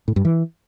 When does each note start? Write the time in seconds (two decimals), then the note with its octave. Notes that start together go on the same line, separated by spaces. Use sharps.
0.08 A2
0.16 G2
0.25 E3